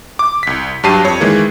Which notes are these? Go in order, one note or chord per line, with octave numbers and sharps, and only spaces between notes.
D6
C2 B6
G2 F#3 G4 A5 C7 D#7
F2 C#5
D#3 E3 G#3 A#3